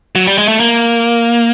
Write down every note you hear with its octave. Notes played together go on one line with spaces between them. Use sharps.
F#3
G3
G#3
A3
A#3